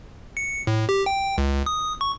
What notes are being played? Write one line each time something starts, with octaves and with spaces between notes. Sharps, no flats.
C#7
A2
G4
G5
C#2
D#6
C#6